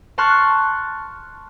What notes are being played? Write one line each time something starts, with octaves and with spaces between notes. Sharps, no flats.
A5 C6 C#6 F6 F#6 A6